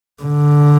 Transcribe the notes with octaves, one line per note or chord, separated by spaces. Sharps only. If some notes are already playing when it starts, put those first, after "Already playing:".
D3